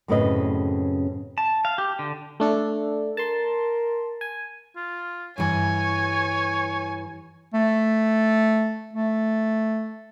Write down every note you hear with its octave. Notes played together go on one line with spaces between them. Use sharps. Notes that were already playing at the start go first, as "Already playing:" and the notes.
F#2 A2 C#3 C4 B4 D#5
A5
F5
G4
D3
A3 D4 A4
A#4 A5 C6
G#5
F4
G2 E3 C#5 G#5
A3
A3